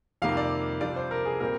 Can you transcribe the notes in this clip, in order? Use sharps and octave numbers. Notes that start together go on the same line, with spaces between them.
F2 C3 D#3 G3 A#3 F5
D5
F2 C3 G3 D4 F4 D5
C5
A#4
G#4
A#2 G3 C4 A#4